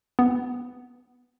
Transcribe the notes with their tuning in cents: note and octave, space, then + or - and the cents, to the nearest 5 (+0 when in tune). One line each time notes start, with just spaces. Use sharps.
B3 +5